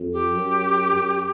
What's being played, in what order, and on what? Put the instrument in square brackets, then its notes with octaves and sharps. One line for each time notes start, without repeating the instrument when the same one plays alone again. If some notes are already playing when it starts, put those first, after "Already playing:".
Already playing: [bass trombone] F2
[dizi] G4
[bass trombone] F#2
F#2